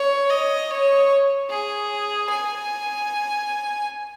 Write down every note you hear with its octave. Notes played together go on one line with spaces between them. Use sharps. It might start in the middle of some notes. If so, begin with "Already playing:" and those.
Already playing: C#5
D#5
C#5
G#4
G#5